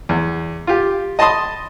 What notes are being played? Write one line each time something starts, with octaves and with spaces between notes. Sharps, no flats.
E2
F4 G4
D#5 A5 B5 C6 D#6